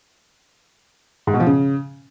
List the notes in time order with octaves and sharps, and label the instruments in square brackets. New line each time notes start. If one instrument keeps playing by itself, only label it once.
[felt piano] G#2
B2
F3
C#3